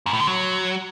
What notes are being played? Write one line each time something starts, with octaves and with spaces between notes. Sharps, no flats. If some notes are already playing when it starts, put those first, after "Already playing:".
F#2
A2
D3
F#3